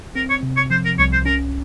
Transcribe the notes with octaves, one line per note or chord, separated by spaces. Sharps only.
C4 A#4
C#5
C3
C#5
F3 C5
A#4
C2 C#5
C5
C#4 A#4